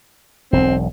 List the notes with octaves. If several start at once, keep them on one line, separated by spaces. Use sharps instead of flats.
E1 B1 C4